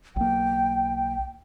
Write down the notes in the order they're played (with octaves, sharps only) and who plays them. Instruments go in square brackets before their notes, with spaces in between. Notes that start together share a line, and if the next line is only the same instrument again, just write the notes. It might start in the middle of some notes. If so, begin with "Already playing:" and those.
[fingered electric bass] B1 A#3 [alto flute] G5